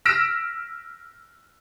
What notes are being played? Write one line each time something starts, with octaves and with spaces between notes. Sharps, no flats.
E6 F6 A#6 B6 D7 E7